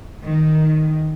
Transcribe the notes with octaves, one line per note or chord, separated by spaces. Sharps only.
D#3